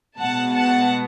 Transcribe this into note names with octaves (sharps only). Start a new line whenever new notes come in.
B2 G#3 B3 F#5 A5
F#5 A5